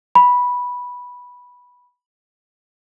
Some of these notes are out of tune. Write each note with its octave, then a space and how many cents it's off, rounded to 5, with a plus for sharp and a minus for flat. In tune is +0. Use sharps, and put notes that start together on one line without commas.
B5 -10